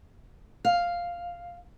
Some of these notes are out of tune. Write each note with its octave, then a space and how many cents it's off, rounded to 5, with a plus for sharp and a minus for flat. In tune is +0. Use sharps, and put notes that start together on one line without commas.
F5 +0